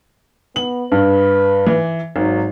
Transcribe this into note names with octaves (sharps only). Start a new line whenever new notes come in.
B3 F#7
G2 B4
E3
G#1 F#3